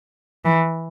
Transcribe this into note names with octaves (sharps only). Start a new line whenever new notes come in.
E3